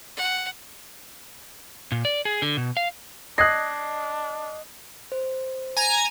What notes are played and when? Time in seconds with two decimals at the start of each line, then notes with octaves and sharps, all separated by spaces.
0.17 F#5
1.92 A#2
2.05 D5
2.25 G#4
2.42 D3
2.57 B2
2.77 F5
3.38 D4 D#5 D#6 F#6 G#6 A#6 C7
5.12 C5
5.77 G#5 A#5 G#6